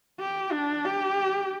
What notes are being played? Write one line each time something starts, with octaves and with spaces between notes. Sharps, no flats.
G4
D4
G4